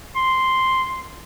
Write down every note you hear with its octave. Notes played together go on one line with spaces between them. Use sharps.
C6